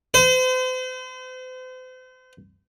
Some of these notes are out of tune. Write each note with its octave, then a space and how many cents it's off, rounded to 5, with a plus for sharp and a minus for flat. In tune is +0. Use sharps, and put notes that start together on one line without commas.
C5 -40